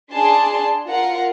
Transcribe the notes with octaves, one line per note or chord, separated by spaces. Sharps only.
D4 G#4 D5 G#5 A5 C6
F4 A#4 F5 F#5